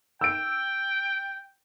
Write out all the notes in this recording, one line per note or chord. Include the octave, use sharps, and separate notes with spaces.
G5 E6 D7